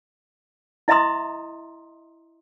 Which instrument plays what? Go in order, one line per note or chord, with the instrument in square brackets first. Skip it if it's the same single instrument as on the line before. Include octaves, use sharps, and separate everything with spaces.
[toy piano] E4 D#5 E5 A#5 C6 D#6